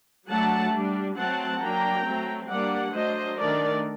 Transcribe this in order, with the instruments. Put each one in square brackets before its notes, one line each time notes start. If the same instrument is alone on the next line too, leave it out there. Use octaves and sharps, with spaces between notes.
[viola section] F#3 A3 D4 F#5 A5
G3 D4
F#3 A3 C4 F#5 A5
F#3 A#3 D4 G5 A#5
F#3 A3 C4
G3 A#3 D4 D5 F#5
F#3 A3 D4 C5 D#5
D#3 A3 D4 A#4 D5